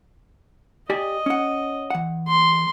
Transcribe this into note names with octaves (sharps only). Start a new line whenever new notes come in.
G4 D5 D#5 G#5
C#4 F#5
E3 F#5
C6